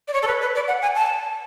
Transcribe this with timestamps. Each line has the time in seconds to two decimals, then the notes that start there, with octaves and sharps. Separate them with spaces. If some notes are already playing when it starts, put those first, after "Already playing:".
0.08 D5
0.13 C#5
0.23 A4
0.27 B4
0.41 B4
0.55 D5
0.68 F#5
0.82 G#5
0.95 A5